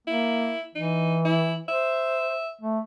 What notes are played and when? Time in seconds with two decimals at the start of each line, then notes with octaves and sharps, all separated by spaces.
0.07 A#3 E4
0.75 E3 D#4
1.25 E4
1.68 C5 E5
2.61 A3